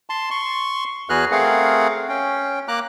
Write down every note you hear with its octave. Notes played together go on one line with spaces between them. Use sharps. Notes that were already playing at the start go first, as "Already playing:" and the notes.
A5 C6
C6 C#6
E2 F#4 G#4 B4 F6 F#6
A3 C4 G#4 A#4 F5 F#5
C#4 G5
A#3 A#5 D6 F#6